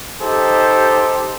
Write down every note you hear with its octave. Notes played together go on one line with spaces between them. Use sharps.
D#4 G4 A4 C5